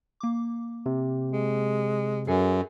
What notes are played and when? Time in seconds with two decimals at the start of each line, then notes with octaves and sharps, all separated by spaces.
0.20 A#3 D6
0.86 C3
1.32 G#3
2.27 F#2 G#4 A4 G#5